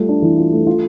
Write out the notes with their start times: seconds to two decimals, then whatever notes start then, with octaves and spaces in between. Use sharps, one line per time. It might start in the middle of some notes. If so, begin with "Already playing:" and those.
Already playing: G3 A3 F4
0.09 D4
0.22 E3
0.37 F4
0.53 A3
0.67 F4